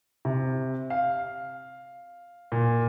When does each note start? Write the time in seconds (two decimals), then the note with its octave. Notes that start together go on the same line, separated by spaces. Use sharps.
0.25 C3
0.90 F5
2.52 A#2